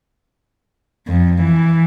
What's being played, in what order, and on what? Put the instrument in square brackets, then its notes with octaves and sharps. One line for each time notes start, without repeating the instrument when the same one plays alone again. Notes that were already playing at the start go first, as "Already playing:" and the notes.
[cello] F2
E3